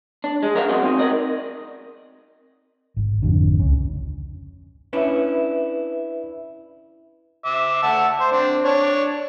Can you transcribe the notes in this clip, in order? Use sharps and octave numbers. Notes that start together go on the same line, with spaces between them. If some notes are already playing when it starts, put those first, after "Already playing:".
D4
G#3
F#2 A#4 E5 F5
G#3 C4 F#4 D5 D#5
C4 D#4
A#4 D5 D#5
G#1
G#1 F2 D3
C#2 C#3
C#4 D4 E4 B4 E5
E5 D6
E5 F#5 A5
C5
C4 D4
D4 C#5